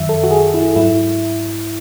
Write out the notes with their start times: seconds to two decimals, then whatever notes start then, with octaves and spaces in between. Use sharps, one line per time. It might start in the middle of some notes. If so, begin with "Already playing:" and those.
Already playing: F#2 D#3 F#3 E5
0.09 A4
0.23 F#4
0.31 G#4
0.54 E4
0.76 G#2 F#3 E4